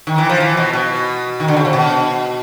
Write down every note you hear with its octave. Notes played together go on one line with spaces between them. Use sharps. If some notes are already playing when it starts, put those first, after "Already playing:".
D#3
E3
F3
E3
B2
B2
D#3
D3
C#3
C3
B2